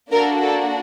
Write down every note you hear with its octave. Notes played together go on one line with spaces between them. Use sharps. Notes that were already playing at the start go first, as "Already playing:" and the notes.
A#3 D4 F#4 A4 A#4
A4